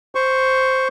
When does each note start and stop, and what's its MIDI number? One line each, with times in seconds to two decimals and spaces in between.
0.15 0.88 72
0.15 0.88 85